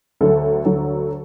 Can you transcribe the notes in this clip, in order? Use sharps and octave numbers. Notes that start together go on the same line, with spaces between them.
D2 D3 F#3 A4
D2 D3 F#3